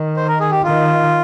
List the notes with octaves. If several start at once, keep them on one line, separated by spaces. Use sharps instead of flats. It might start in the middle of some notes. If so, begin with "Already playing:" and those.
Already playing: D#3
C5
A#4
G#4
G4
D#3 F4